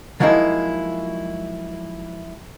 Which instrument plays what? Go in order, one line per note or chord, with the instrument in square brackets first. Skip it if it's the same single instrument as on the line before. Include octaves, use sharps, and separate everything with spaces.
[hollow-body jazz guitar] F3 F#3 G#3 A#3 D#4 E4